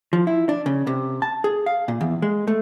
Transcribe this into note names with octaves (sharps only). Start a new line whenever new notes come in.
F3
E4
D4
C#3
C3
A5
G#4
F5
A#2
E2
G#3
A3